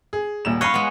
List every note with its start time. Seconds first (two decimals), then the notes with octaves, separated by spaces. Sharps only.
0.13 G#4
0.45 D#1 A#2 E7
0.61 C#5 D#5 F5 B5 F#6
0.74 G#3 B3